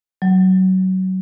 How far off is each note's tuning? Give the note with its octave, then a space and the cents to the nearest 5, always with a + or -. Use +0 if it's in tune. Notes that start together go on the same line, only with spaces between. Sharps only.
F#3 +20